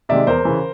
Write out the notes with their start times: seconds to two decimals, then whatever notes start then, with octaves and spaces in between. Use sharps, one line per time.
0.09 C3 D#3 G#3 D5 E5
0.27 E2 A#4 C5
0.45 C#3 E3